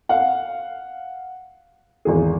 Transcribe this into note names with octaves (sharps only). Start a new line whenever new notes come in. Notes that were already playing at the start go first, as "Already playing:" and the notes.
F5 F#5
G#1 E2 G#4